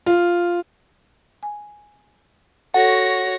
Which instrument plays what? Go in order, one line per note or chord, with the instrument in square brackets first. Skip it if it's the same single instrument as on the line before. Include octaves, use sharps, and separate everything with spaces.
[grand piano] F4
[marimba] G#5
[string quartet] F#4 C#5 A#6 [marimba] A4 [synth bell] F#5